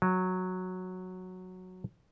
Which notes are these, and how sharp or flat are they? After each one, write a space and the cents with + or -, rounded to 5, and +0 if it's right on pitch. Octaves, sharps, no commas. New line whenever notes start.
F#3 -5